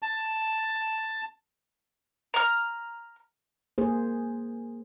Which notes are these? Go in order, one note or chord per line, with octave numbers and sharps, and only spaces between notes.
A5
A#5 F6
A#3 G#4 C5